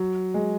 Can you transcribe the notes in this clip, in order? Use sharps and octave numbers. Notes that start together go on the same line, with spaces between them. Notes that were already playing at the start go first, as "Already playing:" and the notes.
Already playing: F#3
G#3